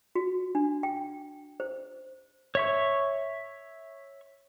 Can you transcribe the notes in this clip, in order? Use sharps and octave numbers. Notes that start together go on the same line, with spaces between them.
F#4
D4
G5
C5
C#5 E5 C#6